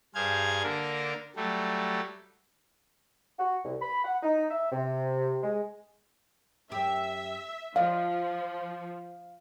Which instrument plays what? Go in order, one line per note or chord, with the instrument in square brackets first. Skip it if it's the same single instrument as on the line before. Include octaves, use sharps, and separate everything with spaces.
[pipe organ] G2 G#4 C5 F5 G#6
D3 A#3 D4 A#4
F#3 G3 A3
[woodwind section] F#4
C2
B5
F#5
D#4
E5
C3
G#3
[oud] F#2 G4 [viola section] E5
[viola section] F3 [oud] D5 D#5 [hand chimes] F5